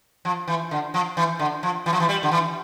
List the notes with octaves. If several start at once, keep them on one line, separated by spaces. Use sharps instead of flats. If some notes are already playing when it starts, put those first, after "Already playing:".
F3
E3
D3
F3
E3
D3
F3
E3
F3
E3
G3
D3
E3